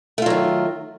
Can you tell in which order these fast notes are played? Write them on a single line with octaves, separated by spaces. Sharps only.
A3 F4 F#3 D#3